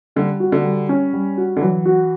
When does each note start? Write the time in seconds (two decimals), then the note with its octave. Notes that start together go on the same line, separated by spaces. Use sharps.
0.16 D3 G3
0.40 F#4
0.52 D3
0.64 G3
0.89 C#4
1.13 G3
1.37 F#4
1.57 D3
1.61 E3 F#3
1.86 F#4